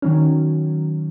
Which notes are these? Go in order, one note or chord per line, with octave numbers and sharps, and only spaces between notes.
D#3 F#3 C#4